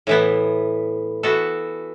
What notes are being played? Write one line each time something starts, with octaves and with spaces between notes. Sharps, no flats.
A2 E3 B3
E3 B3 F#4 A4